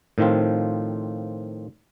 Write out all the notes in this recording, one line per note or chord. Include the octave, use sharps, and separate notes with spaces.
A2 D#3 F3 C4 F4